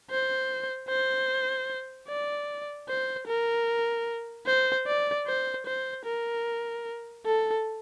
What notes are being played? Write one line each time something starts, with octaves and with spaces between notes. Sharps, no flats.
C5
C5
D5
C5
A#4
C5
D5
C5
C5
A#4
A4